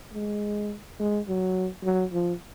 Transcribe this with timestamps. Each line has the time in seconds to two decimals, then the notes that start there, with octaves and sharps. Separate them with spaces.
0.14 G#3
1.00 G#3
1.28 F#3
1.84 F#3
2.13 F3